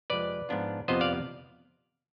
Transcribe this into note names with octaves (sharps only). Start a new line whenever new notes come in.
F2 C3 F3 G#3 B4 D5
G#2 F3 B3 D4 F4
F2 C3 F3 B3 F4 C5 D#5
D5 F5